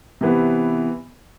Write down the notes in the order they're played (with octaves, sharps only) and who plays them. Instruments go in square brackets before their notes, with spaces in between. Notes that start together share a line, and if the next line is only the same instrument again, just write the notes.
[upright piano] C3 E3 B3